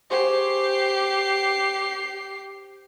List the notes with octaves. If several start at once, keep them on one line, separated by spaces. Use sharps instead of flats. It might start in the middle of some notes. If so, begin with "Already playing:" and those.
G4 G#4 C5 C#6 C7